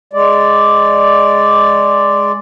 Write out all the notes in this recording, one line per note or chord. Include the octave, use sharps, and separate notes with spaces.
G#3 D5